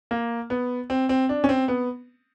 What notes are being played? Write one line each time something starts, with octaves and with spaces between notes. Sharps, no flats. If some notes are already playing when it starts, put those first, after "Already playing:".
A#3
B3
C4
C4
D4
C#4
C4
B3